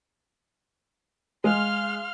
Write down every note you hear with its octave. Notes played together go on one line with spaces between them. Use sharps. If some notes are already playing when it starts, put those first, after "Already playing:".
G#3 F5 C6 F6